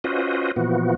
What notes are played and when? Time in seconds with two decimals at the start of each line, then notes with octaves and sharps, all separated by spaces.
0.04 C#4 F4 F#4 B4 C5 D#5
0.56 A#2 E3 F3 B3 F#4